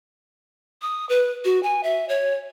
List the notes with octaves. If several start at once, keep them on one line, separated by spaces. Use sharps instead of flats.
D#6
B4
F#4
G#5
E5
C#5